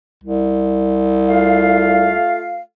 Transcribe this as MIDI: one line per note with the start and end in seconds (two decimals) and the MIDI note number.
0.24 2.14 36
1.28 2.59 57
1.28 2.59 65
1.28 2.59 77